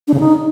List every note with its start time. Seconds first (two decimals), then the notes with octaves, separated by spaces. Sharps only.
0.08 D4
0.14 C#3
0.20 D#4